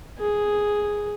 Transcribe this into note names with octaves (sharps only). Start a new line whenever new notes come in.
G#4